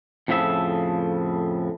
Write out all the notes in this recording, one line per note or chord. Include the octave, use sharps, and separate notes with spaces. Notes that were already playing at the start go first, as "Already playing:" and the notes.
F2 A2 C#3 F3 E5